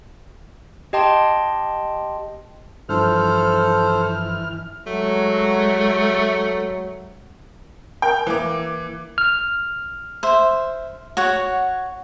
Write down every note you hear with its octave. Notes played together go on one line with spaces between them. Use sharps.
G4 D#5 G5 A5 C6
G2 E3 F3 A4 C5 F6
F#3 G#3 A3
A#4 G5
E3 A#3 D6
F6
C5 E5
F#4 C#5 F#5